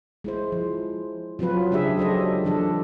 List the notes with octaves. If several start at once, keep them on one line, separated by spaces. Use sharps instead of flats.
G#3 E4 C5
F3
F3 F#3 C4 F4 B4
C#3 G#3 D4 G4 G#4 E5
F#3 A4 C5 D#5
E3 F3 D4 A4